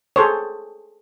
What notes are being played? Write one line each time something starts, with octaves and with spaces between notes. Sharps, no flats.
G#4 A4 C5 C#5